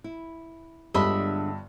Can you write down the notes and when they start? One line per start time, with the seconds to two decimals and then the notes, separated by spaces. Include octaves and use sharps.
0.04 E4
0.94 G1 G2 D3 G#3 D4 D#5 E5 B5